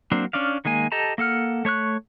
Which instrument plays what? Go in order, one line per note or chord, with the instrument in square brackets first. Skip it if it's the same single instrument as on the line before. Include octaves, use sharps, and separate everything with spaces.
[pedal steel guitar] F#3 A#3 C4 D4
C#4 D4 D5 F5
D#3 G#3 A#3 G#5
G4 A4 D#5 A5 A#5
A#3 A4 F#5 F6
A3 C#5 C#6 F#6